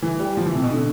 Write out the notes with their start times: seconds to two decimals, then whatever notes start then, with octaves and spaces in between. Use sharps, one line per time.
0.02 E3
0.19 G3
0.37 F3
0.46 E3
0.55 C3
0.63 B2
0.72 D3